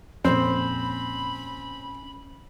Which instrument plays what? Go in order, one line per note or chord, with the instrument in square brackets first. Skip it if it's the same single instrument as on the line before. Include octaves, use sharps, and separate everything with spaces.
[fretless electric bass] F2 A#2 [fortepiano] C4 [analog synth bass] C#4 [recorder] B5